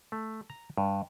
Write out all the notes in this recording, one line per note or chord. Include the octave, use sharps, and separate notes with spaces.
A3
A#5
G2